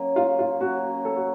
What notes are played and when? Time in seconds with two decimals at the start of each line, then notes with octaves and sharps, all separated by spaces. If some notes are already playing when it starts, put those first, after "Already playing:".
Already playing: F#3 A#3 C#4
0.16 F4
0.39 F4
0.60 F#3 A#3 C#4 F#4
1.05 A4
1.16 F#4